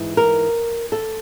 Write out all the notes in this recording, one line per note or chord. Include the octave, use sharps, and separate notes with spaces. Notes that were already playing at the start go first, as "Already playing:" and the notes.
Already playing: G#2 E3
A#4
A4